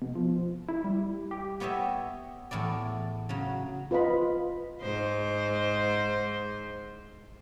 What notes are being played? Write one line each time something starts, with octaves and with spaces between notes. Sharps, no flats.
B2
F3
E4
G3
G4
B3 G4 C#5 D#5 E5
E2 A2 E4 D5
C#3 F#3
F4 B4 D#5 B5
G#2 C5